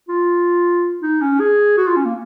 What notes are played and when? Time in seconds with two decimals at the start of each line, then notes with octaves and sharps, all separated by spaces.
0.09 F4
1.02 D#4
1.21 C#4
1.40 G#4
1.77 F#4
1.87 F4
1.96 C#4
2.05 A#3